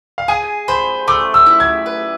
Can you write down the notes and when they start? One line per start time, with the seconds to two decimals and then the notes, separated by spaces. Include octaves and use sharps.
0.18 F5
0.28 G#4 G#5
0.68 C5 B5
1.08 A3 D6
1.34 E6
1.46 E4
1.60 G#6
1.86 B4